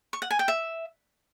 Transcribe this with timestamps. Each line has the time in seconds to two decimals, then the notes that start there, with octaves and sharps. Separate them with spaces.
0.13 C#6
0.22 F#5
0.31 G#5
0.39 G5
0.48 E5